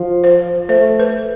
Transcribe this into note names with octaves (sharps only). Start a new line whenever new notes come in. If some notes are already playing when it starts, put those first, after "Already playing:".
Already playing: F3
C5
A3 C5
B4